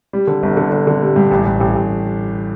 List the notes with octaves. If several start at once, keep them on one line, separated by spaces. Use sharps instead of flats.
G3
D3
G1
D3
D3
D3
G3
G2
A1
A1
A1
A1